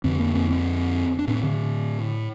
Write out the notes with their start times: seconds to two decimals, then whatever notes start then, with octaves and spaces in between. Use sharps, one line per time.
0.04 F2 D3 C4
0.19 A#3
0.35 C4
0.51 C4
1.19 D4
1.28 A2 C4
1.43 D3